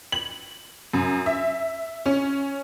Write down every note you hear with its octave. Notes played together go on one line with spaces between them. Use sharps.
F#7
F#2
E5
C#4